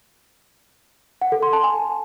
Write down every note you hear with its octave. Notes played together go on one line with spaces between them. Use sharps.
F#5
A4
C6
A5
G#5